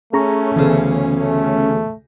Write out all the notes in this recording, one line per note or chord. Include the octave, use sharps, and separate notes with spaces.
A3 C#4 G#4 A#5 C#6
D2 C#3 E3 B3
A3